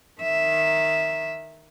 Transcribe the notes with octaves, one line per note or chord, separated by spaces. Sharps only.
D#3 E5